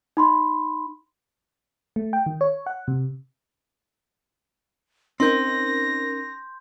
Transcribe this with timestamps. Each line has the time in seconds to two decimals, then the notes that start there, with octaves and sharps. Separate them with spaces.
0.17 D#4 B5 C6
1.96 A3
2.13 G5
2.26 D#3
2.41 C#5
2.66 F#5
2.88 C3
5.20 C4 C#4 D#4 A#4 C6 G6 A#6